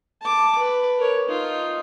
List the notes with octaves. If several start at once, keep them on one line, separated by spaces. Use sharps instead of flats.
A5 D6
B4
A#4 C#5
D#4 F4